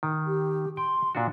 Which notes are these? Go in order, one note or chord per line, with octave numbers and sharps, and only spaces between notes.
D#3
G4
G5 C6
A#2 D4 F#4